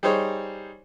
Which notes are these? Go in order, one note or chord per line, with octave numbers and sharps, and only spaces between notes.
G3 D#4 G#4 C5 C#5